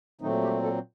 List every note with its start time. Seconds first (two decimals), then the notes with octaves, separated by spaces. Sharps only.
0.21 A#2 D#3 F#3 A3 C4 D#4
0.42 G3 G4
0.63 A3 A4